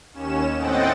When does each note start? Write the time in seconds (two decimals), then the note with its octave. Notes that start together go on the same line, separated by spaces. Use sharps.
0.13 D#2 C#4 E7
0.57 A2 C4 D#5 F#5 G5 A6